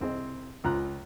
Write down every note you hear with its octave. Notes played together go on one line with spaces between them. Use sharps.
C2 C4 G#4 D#5
C#2 F4 A#5 F#6